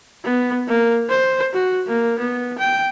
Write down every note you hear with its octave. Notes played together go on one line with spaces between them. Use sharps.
B3
A#3
C5
F#4
A#3
B3
G5